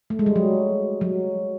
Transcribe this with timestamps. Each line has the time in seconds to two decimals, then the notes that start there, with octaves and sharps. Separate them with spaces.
0.10 A3
0.19 G#3
0.26 G3
0.36 F#3
1.01 F#3